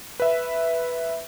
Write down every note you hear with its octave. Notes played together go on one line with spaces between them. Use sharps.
B4 E5